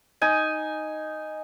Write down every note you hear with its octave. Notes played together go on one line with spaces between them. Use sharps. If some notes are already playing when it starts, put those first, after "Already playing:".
D#4 G#5